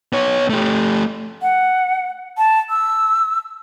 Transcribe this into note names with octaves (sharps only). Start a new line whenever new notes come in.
B3 C#5
A3 G4
F#5
A5
E6